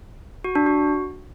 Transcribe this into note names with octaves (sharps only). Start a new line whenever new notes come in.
F#4
D4
F#4